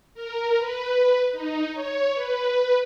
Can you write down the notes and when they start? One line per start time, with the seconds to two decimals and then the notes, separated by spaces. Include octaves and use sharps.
0.14 A#4
0.58 B4
1.32 D#4
1.73 C#5
2.14 B4